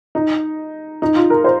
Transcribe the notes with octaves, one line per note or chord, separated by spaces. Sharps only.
D#4
D#4
F4
A#4
C5